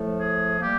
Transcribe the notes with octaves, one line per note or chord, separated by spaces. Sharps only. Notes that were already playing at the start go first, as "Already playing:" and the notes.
Already playing: A2 F3 A3
G#4
G3 A#3 G4